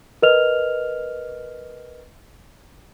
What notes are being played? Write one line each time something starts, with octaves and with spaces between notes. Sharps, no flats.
A#4 B4 D#5 F6 F7